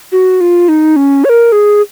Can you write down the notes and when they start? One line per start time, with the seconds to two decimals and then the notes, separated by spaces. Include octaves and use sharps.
0.12 F#4
0.41 F4
0.69 D#4
0.96 C#4
1.24 C#5
1.29 A#4
1.52 G#4